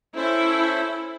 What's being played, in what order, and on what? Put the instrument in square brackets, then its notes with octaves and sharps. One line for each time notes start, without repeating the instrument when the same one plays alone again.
[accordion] C#4 A4 C5 [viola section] E4